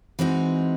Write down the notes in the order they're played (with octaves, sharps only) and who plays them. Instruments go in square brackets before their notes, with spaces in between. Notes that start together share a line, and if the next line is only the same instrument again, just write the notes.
[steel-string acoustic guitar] E3 G#3 C4 D#4 F#4